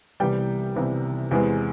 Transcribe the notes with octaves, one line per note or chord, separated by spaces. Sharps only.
C2 C3 E3 G3 B3 G5
C2 C3 E3 G3 B3
E2 C3 E3 G#3 B3